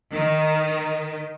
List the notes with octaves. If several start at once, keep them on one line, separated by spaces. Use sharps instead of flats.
D#3